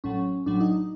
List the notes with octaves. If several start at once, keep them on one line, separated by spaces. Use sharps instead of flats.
A1 A2 F#3 C#4
A1 A2 F#3 D4
D#4